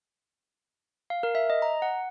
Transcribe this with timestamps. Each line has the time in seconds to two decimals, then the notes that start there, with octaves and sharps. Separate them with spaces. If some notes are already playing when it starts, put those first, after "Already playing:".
1.10 F5
1.23 A#4
1.35 E5
1.50 D#5
1.62 A#5
1.82 F#5